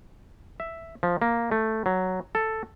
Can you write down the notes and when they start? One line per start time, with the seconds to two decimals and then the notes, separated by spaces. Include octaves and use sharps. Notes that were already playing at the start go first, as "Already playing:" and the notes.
0.60 E5
1.03 F3
1.22 A#3
1.52 A3
1.86 F#3
2.35 A4